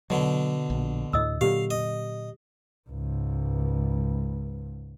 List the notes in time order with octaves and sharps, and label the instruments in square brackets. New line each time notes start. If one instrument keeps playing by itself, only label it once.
[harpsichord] B2 D3 [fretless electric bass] F#3
[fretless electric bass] A#1
[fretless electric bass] D2 A2 [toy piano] D#5 D#6 E6
[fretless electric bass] A#2 D3 F#3 [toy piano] G4 [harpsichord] F5
[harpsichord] D#5
[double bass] C#2 G#2